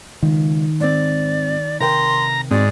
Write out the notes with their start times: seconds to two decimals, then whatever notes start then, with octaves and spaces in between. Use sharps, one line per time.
0.23 C#2 D#3
0.80 G#2 C4 D5
1.80 C3 A#4 G5 A#5 C6
2.51 G#2 C4 F#4 D5